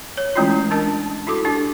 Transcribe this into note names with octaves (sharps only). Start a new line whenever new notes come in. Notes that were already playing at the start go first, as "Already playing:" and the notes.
C#5
E3 G#3 A3 C#4 E4 F4
D4 A#4 D#5 A5
E4 F#4 A4 D6
D4 G4